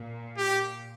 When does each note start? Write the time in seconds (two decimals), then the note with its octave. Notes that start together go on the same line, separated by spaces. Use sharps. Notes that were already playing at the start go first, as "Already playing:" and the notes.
Already playing: A#2
0.37 G4